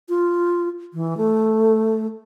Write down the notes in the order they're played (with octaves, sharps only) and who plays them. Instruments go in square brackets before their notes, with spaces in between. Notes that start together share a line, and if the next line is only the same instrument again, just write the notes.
[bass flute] F4
E3
A3